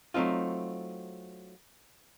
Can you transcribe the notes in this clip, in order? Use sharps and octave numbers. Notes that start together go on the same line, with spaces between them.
F#3 A3 C4 D#4 F4